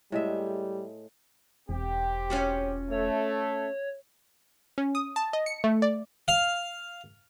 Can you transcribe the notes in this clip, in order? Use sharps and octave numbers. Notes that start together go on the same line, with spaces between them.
A2 G3 G#3 E5
E1 C4 G4
C#4 F4 F#4
A3 C#5
C#4
D#6
A5
D#5
C#7
A3
D5
F5